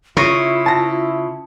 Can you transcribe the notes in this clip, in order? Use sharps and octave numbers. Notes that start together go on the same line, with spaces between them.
C#3 E4 F4 C#6 A#6 D#7
A5 A#6